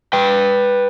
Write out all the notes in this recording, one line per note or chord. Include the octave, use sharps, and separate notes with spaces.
B4 G5